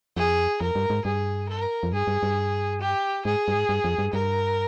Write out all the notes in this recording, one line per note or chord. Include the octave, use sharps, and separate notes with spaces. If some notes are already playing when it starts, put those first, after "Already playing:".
F2 G#4
F2 A#4
G2
G#2
G2 G#4
A#4
F2
G2 G#4
G2
G2
G4
G#2 G#4
G2
G#2
G2
F2
G2
G2 A#4